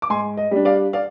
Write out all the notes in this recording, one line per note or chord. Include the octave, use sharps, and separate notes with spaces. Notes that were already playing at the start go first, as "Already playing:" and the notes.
D6
G#2 G#5 C6
D#5
G3 D4
D5 F5
D5 F5